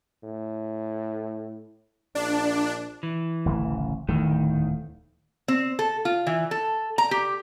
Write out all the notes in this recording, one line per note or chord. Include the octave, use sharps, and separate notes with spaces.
A2
A#1 D4
E3
D1 A1 C#3
D1 E2 D#3 E3 A3
C4
A4
F4
E3
A4
A#5
G4